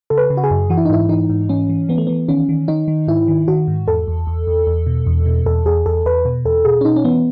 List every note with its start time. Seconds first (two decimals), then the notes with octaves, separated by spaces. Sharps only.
0.10 C#3 A4
0.18 B4
0.30 C#3
0.37 F#4
0.44 G#4
0.51 F#2
0.70 E3 F#4
0.77 E4
0.85 D#4
0.89 G#2 E4
1.09 E3 D#4
1.30 G#2
1.49 E3 C#4
1.69 E3
1.89 E3 B3
1.98 A3
2.07 E3 B3
2.28 D#3 C#4
2.49 D#3
2.68 D#3 D#4
2.88 D#3
3.08 G#2 E4
3.28 D#3
3.48 D#3 F#4
3.68 G#2
3.87 E2 A4
4.07 E2
4.27 E2
4.47 E2
4.67 E2
4.86 B2
5.06 E2
5.26 B2
5.46 E2 A4
5.65 E2 G#4
5.86 E2 A4
6.05 E2 B4
6.25 B2
6.45 E2 A4
6.65 B2 G#4
6.81 C#4
6.85 B2 D#4
6.96 C#4
7.04 E3 B3